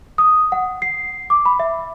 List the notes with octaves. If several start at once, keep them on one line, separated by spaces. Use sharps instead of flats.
D#6
F#5
C7
D6
B5
E5